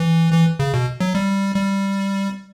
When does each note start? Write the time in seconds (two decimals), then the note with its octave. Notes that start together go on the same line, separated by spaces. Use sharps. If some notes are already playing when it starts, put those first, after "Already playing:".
Already playing: E3
0.32 E3
0.59 C#3
0.74 B2
1.00 F#3
1.15 G3
1.55 G3